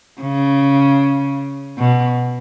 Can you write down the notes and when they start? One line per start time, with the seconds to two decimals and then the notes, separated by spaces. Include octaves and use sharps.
0.22 C#3
1.78 B2